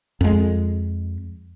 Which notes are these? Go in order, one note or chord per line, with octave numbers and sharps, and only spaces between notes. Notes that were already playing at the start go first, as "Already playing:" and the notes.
F2 G#3